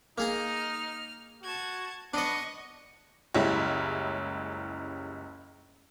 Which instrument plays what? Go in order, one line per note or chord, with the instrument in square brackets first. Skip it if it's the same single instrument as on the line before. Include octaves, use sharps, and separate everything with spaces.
[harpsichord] A#3 G#4 A#5 [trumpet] D#4 [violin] F6
[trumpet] F#4 [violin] A5 G#6
[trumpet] B3 [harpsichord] D4 D5 [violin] D#5 C#6
[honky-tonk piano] F#1 C#2 G3 C#4 E4